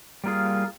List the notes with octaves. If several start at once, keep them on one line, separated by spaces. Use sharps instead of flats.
G3 A#3 F4 G#4